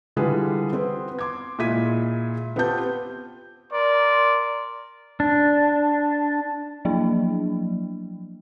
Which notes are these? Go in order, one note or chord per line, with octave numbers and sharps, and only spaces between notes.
D3 E3 G3 F4 G#4 B4
B3 C4
C6 D6 G#6
A#2 G#3 E4 G#6 B6 D#7
B3 C4 F4 G4 A5 G6
A#4 D5 C6
D4
F3 F#3 A#3 D4